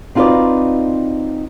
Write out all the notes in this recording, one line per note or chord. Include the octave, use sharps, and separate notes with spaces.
C4 D#4 F4 F#4 B4 D5